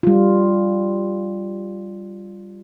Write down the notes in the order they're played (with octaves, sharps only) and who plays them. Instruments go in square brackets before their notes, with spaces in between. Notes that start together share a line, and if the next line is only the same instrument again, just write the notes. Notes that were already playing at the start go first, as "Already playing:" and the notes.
[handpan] G3 F4